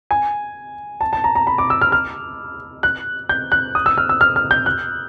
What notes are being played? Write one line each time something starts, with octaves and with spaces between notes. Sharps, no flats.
G#5
A5
A5
A#5
A#5
B5
D6
E6
F6
F6
F#6
G6
F#6
D#6
E6
F6
E6
F6
F6
G6
F#6